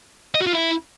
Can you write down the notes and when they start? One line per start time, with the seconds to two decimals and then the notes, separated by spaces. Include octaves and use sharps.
0.35 D#5
0.41 F#4
0.47 F4
0.53 E4